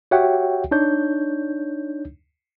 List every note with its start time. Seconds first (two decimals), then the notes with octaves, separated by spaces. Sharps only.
0.11 F#4 G4 C#5 E5 F#5 G5
0.71 D4 D#4 C#5 G6